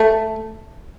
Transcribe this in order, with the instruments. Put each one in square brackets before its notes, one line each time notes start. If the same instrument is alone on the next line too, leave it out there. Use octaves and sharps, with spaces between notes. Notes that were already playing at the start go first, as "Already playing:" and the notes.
Already playing: [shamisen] A3